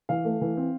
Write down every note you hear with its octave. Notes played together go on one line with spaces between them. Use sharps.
E3 F5
A3
E3
C4